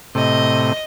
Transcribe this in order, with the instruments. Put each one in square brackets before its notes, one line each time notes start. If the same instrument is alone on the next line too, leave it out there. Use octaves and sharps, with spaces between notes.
[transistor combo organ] A2 C3 [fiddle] D#5